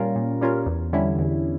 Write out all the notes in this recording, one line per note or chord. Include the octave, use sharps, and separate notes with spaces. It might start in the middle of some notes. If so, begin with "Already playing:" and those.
Already playing: A#2 G3 C#4 F4 A#4
A#2
G3 C#4 F4 A#4
E2
D3 G3 C#4 E4
E2